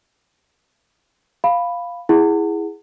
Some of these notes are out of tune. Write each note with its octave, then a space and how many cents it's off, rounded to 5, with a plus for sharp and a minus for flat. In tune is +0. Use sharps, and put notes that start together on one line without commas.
F5 +0 B5 +0
E4 +0 G#4 -5 F#5 +0